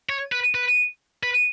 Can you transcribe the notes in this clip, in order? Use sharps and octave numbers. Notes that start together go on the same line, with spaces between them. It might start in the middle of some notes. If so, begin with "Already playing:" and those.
C#5
B4
B4
B4